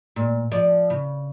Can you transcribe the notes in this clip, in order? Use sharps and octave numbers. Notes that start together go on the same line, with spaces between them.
A#2
F3 D5
C#3